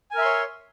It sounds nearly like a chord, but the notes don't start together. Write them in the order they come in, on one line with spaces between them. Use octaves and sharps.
G#5 A#4 E5 C6 C#5